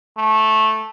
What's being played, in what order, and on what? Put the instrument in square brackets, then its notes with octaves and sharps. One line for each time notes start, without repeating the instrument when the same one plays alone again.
[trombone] A3